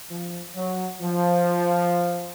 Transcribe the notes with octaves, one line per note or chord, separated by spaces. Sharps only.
F3
F#3
F3